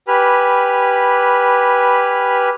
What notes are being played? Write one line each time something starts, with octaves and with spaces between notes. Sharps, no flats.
G4 B4 G#5 B5 F6